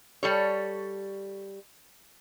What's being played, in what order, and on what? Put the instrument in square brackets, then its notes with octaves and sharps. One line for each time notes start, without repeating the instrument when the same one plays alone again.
[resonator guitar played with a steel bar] G3 A4 C#5